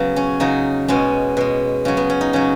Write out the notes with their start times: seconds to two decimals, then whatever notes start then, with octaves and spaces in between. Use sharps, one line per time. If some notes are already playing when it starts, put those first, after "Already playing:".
Already playing: C#3 F#3 B3
0.16 C#4
0.40 C#3 F#3 D#4
0.88 B2 G#3 C#4
1.37 B2 G#3
1.85 C#3 F#3 C#4
1.97 B3
2.10 C#4
2.21 D#4
2.33 C#3 F#3 C#4